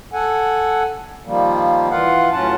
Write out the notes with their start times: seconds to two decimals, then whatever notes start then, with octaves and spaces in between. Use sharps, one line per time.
0.13 A4 F#5 G#5
1.25 D#3 F3 G3 A#3
1.90 E3 F4 F5 F#5
2.32 A2 F#3 C#4 F4 F#5 A5